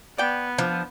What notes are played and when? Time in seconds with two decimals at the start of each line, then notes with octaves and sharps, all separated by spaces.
0.18 B3 D5 G5
0.58 F3 D4